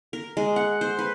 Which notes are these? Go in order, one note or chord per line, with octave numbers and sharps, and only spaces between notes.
A#4
G#3
F#5
C5
B4